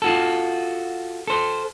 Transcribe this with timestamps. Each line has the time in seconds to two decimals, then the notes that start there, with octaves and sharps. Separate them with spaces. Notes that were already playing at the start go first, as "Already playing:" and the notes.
0.02 F4 F#4 A4
1.27 A4 C5